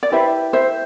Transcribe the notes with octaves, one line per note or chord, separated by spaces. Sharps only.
D5
E4 G4 B4 C5 E5
C5 E5